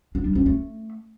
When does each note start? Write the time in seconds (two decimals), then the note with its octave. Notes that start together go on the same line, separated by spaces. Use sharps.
0.15 D4
0.25 G3
0.35 C#4
0.46 A3